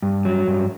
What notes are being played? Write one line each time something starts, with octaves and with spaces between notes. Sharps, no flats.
G2
F#3
G2